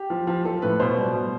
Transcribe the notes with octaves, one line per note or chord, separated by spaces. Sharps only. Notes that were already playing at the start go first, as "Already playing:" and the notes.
Already playing: G4
F3
F3
F3 A4
A2 B4
B2 C5
G3
B2